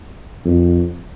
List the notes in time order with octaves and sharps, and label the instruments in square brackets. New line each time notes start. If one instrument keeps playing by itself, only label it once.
[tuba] F2